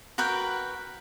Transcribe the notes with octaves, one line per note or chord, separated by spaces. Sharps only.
F#4 A#4 B4 G5